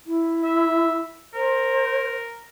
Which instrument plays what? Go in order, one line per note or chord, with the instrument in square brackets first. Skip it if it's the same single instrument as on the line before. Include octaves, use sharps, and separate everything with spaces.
[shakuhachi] E4
[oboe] E5
[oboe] A#4 [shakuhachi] C5